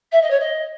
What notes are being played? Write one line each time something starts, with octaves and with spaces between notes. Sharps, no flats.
E5
D#5
C#5
D#5